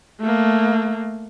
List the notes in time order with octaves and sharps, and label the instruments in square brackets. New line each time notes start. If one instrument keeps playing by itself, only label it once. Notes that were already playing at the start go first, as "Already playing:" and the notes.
[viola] A3 A#3